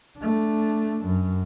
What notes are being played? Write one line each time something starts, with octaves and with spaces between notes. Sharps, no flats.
A3 D4
F#2